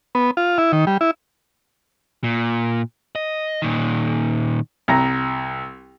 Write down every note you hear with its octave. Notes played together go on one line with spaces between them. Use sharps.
B3
F4
E4
D#3
G3
E4
A#2
D#5
A#2 D#3
C2 A#5